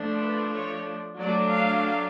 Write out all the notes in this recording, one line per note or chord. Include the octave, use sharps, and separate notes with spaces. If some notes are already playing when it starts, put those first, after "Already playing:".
Already playing: F3 A3 D4
B4
C#5
F#3 A3 D4 D5
F5